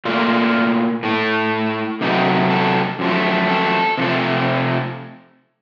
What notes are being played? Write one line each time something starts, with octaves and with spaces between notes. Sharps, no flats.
A#2 A3 F4
A2 A3
C3 F#3 A3 D#4
A4
F#2 F3 A3
A4
C3 F3 A3